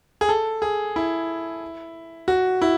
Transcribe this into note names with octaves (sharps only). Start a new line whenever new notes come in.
G#4
A4
G#4
E4
F#4
E4